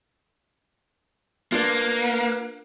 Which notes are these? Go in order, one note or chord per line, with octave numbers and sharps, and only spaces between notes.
A#3 D4 F4 A#4 B4